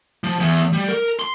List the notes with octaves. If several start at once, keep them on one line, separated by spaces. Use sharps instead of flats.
F3
E2
G3
A#4
C6